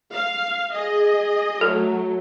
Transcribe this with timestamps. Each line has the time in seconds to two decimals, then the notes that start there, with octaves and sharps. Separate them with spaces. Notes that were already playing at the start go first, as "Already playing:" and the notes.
0.11 F5
0.73 G#4 D#5
1.61 F#3 A3 A4